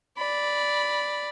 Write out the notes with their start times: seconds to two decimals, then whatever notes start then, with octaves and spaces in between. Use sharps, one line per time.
0.18 D5 B5